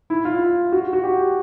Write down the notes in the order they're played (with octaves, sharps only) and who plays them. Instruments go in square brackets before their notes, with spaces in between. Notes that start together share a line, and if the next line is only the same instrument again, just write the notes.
[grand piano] E4
F4
F#4
F#4
G4